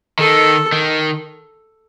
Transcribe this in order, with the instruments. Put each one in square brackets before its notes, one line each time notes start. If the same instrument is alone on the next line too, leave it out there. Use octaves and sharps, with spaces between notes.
[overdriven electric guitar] D#3 [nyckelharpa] A4
[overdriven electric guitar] D#3